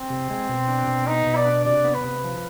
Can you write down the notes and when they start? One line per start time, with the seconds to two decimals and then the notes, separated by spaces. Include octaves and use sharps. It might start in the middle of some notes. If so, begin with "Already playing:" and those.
Already playing: C4
0.10 C3
0.30 G#3
0.49 B2
0.68 D4
0.88 B2
1.07 B3 D#4
1.27 B2
1.36 D5
1.46 D4
1.65 C3 D5
1.85 B3
1.94 B4
2.04 C3
2.24 F3